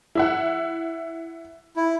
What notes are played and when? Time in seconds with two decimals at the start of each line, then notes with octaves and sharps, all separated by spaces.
0.15 E4 E5 F#5
1.76 E4